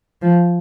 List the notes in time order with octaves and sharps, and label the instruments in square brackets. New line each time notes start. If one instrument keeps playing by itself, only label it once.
[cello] F3